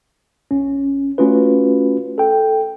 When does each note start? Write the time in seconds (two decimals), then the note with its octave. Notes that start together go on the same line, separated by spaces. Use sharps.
0.51 A#1 C#4
1.18 A3 C#4 F4 F#4 B4
2.18 A4 G5